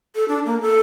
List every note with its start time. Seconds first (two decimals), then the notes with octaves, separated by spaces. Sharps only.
0.16 A4
0.28 D4
0.46 A#3
0.61 A4